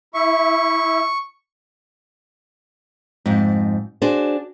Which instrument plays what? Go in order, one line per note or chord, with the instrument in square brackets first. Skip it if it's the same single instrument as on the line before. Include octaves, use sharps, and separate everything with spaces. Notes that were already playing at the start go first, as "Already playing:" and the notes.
[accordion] E4 E5 [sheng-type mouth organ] C#6
[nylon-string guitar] F2 G#2
D4 F#4 G#4 C5